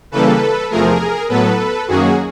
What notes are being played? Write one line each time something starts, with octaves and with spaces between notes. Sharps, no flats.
C#3 E3 G3 A#3 A4 B4
E2 C3 F3 A3 G#4 A#4
A2 F#3 B3 A4 B4
F#2 D#3 F#3 A#3 C#4 F#4 G#4